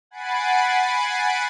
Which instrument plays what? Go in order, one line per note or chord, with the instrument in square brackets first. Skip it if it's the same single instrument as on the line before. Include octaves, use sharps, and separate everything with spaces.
[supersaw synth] F#5 G#5 B5 A6 C7 D7